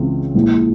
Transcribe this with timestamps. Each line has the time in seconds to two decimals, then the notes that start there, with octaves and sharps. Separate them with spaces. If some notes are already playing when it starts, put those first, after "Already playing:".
Already playing: C#2 C#3 E3 G#3 C4
0.34 A#1 A#2 G#3 E4